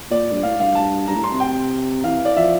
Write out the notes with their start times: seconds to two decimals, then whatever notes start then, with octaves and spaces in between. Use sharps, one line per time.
0.11 A#2 D5
0.33 G2
0.43 A2 F5
0.59 G2 F5
0.75 A5
1.07 G2 A#5
1.15 A2
1.24 C6
1.32 C3
1.40 G5
2.04 E3 F5
2.25 D5
2.36 F3 E5